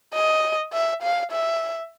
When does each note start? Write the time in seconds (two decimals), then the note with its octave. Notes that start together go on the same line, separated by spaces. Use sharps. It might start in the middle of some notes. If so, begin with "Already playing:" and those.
0.14 D#5
0.73 E5
1.02 F5
1.31 E5